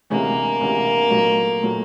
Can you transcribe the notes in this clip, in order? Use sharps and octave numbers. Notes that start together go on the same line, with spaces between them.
D2 C3 E3 G#3 A#3 C#4
D2 C3 E3 G#3 C#4
B1 A#2 F#3 A3
A#2 F#3 A3